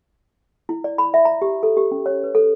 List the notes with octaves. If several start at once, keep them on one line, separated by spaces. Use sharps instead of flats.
E4
D5
B5
E5
A#5
G4
A4
G4
C#4
C#5
B4
A4